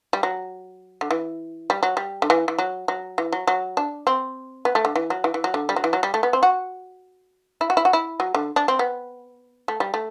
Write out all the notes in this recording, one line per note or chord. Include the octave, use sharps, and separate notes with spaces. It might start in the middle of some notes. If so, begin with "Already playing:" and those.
G3
F#3
D3
E3
G3
F#3
G3
D3
E3
E3
F#3
F#3
E3
F#3
F#3
D4
C4
B3
A3
D3
E3
F#3
E3
E3
F#3
D3
G3
F#3
E3
F#3
G3
A3
B3
C4
F#4
E4
F#4
E4
F#4
E4
F#3
D3
D4
C4
B3
A3
G3
A3